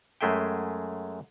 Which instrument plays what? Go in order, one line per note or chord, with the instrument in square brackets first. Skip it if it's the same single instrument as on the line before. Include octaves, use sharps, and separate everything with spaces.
[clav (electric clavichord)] F#2 G#3 A3 G#4 E5 G5